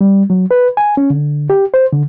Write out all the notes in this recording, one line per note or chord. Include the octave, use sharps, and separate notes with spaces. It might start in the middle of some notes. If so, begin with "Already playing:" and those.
G3
F#3
B4
G#5
C#4
D3
G4
C5
D3